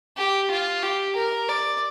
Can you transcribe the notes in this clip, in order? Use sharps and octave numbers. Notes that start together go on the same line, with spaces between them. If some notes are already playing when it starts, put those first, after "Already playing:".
G4
F4
G4
A#4
D5